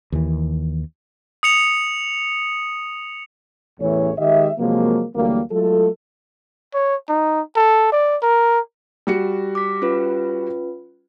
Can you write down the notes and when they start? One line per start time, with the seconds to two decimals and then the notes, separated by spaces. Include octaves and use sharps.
0.12 D#2 E3
1.43 D#6 C#7 F7
3.80 A1 E2 A2 E3 A3 C#5
4.18 D#3 G#3 G4 D#5 E5
4.59 C3 F3 F#3 G#3 A#3
5.16 D2 E3 F#3 G3 A#3
5.51 F#3 G#3 A3 F4 A4
6.74 C#5
7.09 D#4
7.56 A4
7.92 D5
8.22 A#4
9.07 G3 F#4 C#7
9.55 D6 B6
9.82 C#4 F4 B4